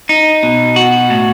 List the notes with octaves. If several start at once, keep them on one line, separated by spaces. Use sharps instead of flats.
D#4
B2
F#4
A2